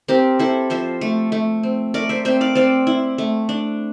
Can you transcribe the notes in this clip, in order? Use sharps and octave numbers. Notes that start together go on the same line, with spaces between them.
C4 G4 A#4
E4 A4 C5
F3 C5 E5
A3
A3
C4
A3 A#4 D5
C5 E5
C4 C5 E5
D5 F5
C4 D5 F5
E4
A3
D4